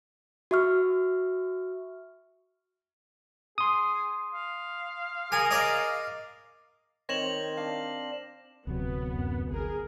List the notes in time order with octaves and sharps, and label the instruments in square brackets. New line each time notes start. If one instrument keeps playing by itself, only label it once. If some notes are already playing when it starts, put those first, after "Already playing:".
[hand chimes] F#4 E5 C#6 F6
[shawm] G#4 [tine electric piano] C6 D#6
[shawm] F5
[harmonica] G#4 A#4 [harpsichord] G#5
[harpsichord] D5 D#5
[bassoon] D#3 [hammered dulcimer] C4 [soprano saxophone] C#5 [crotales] A#6 E7 F#7
[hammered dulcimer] D4 [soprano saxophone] F5
[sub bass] D1 [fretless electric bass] D2 C3 F#3 [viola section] B3
[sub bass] F#2
[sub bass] G1 [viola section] G#4 A#4